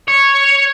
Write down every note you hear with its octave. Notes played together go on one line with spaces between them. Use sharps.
C#5